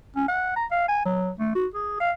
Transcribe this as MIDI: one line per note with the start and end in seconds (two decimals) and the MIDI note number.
0.16 0.27 61
0.28 0.53 78
0.56 0.65 82
0.71 0.88 77
0.88 1.01 80
1.05 1.32 54
1.39 1.52 57
1.55 1.67 66
1.74 1.98 68
2.00 2.12 77